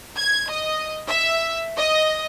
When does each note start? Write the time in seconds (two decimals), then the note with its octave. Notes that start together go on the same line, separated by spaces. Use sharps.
0.16 G#6
0.49 D#5
1.08 E5
1.77 D#5